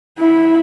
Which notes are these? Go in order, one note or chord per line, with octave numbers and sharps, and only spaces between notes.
E4